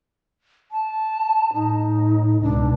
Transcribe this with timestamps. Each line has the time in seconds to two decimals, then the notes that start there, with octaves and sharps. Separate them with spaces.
0.72 A5
1.53 A2 D#4
2.42 C#2 B2 D4